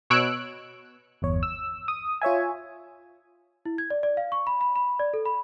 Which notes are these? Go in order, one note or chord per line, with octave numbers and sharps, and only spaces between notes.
B2 C#5 E6 F#6 D7
G1 E2 C#5
E6
D#6
F4 C#5 E5 G#5
E4
G#6
D5
D5
F5
C#6
B5
B5
B5
D5
A4
B5